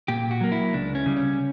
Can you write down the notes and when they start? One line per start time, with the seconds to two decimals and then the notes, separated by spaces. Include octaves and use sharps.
0.08 A#2 G4
0.31 F#4
0.41 F#3 A#3
0.52 E4
0.74 C#2 D4
0.95 C#4
1.06 C#3 G3
1.17 C#4